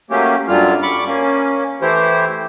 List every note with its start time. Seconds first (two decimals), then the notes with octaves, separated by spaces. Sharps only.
0.10 F#3 A3 A#3 C#4 G4
0.48 F#2 D3 F#3 G3 F4 F6
0.83 B5 C#6 D6
1.07 A#3 C#4
1.82 E3 A3 E4 G4 C5